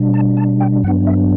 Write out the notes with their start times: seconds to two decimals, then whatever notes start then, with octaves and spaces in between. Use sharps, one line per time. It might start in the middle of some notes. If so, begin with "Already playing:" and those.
Already playing: B2 G3 D4
0.14 A5
0.37 A5
0.60 G5
0.83 G2 F#3 B3 D4 F#5
1.07 E5